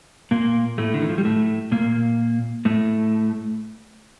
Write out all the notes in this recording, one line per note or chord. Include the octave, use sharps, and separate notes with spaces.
A#2 A#3
A2 A3
D3
D#3
F3
G3
A2 A3
A#2 A#3
A2 A3